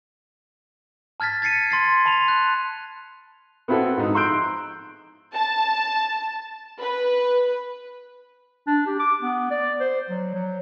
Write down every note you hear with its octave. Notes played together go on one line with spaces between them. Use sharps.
A5 F6 G#6 A6 B6
G#6 A6 C7 C#7 D#7
C6 A6 C7
A5 B5 C6 F7
F#6
B3 C4 E4 F#4 A4
G#2 D#4
A#5 C6 E6 F#6 G6 D7
A5
B4
D4
G4
D6
B3
D5
C5
F#3
F#3